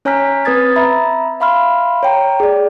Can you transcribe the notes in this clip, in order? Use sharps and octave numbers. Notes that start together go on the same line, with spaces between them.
C#4 C#5 G#5 A#5 F6 B6
C4 B4 D#6 G#6 A6
E5 A#5 B5
E5 F5 B5 C6 F6
C#5 G5 A#5
G#4 D5